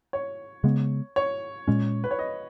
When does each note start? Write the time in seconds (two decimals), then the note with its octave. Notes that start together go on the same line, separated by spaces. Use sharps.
0.13 C#5
0.64 C#3 G#3 B3
1.16 C#5
1.68 A#2 G#3 C#4
2.04 B4
2.11 C#5
2.19 D#5